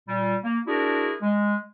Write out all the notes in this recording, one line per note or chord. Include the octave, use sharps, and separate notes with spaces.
A#2 G3
A#3
D4 E4 F#4 G#4 A#4
G#3